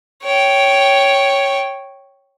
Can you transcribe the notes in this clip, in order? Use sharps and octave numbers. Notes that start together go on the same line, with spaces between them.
C#5 G5